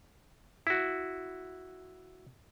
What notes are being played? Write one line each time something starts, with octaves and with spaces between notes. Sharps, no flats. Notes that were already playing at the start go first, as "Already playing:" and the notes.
E4 F#4